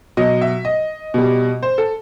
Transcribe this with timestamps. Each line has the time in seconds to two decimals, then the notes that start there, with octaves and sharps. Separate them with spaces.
0.17 B2 F#3 D#5
0.42 E5
0.65 D#5
1.14 B2 G3
1.63 C5
1.78 A4